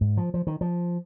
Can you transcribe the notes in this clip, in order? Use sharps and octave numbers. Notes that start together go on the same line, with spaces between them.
G#2
F3
F3
D#3
F3